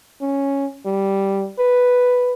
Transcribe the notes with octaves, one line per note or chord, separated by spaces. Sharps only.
C#4
G3
B4